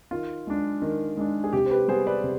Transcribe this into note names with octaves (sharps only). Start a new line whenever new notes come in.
D#3 F4
G#3 D4
D#3
G#3 D4
G#4
C3 G4
C5
G4 B4
G3 B3 G#4 C5
B4 D5
C3